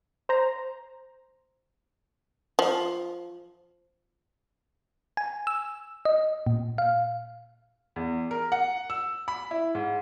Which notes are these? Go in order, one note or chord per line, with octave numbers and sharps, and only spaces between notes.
C5 A#5
F3
G#5
E6
D#5
A#2
F5
E2
A#4
F#5
E6
B5
E4
G#2